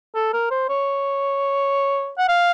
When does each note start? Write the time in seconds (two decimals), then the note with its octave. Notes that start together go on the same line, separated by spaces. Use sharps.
0.15 A4
0.33 A#4
0.51 C5
0.69 C#5
2.18 F#5
2.29 F5